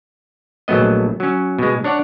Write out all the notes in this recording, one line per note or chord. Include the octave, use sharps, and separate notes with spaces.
A#1 F#3 A3 B3 D#5
F#3 C#4
B2 G#3
D4 C#5 D5 F#5